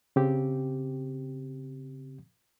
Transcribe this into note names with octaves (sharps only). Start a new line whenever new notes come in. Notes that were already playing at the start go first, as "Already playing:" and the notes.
C#3 C4 G4